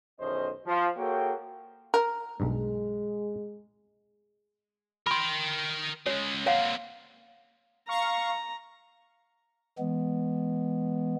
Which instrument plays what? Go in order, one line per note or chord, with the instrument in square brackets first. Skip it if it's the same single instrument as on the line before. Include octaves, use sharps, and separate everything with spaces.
[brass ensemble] B1 E2 D#3 C#4 C5 D#5
F3
A#3 F#4 G#4 A4 C#5 G5
[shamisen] A#4
[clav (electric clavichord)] B1 G2 [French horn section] G#3
[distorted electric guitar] A#4 G5 [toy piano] B5 C6
[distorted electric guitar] C#3 G#3 [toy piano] C#5
[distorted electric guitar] A#3 C4 [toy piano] C#5 F5 F#5
[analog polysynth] F5 C#6 [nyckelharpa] A#5
[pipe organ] E3 G#3 B3